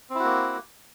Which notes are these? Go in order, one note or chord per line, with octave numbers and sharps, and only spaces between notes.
A#3 C4 E4 F#4